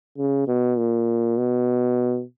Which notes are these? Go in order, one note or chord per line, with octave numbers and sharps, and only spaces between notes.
C#3
B2
A#2
B2